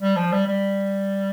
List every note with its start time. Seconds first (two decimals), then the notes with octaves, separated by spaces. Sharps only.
0.02 G3
0.16 F3
0.32 G3
0.47 G3